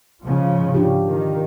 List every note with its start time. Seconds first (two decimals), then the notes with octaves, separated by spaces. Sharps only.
0.25 G#2 C#3 F3
0.74 D4 F4 G4
1.07 D#3